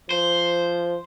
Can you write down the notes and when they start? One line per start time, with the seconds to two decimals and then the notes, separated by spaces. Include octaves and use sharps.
0.11 F3 C5